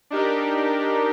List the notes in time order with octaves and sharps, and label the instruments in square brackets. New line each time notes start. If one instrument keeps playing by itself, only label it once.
[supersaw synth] D4 D#4 G4 A#4